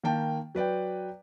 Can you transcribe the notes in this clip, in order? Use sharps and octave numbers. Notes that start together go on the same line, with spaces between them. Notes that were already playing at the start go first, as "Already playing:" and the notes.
D#3 A#3 G5 A5
F#3 B4 D5 G5